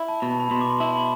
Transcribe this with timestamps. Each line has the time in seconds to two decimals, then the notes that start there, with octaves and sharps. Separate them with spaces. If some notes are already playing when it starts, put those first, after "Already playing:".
Already playing: E4
0.08 A5
0.22 B2 B5
0.31 A5
0.40 B5
0.51 B2 C6
0.61 D6
0.70 C6
0.80 E4 A5